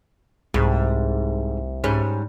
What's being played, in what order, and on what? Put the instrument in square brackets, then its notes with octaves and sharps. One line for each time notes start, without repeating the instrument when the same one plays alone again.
[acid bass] C2 [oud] G#2
[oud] G#2 G3 C#4